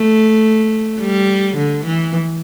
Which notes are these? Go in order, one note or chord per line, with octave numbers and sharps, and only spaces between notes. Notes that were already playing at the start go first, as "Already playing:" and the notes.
Already playing: A3
G3
D3
E3